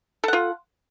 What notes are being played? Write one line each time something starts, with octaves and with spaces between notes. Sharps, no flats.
F4 A4 F#5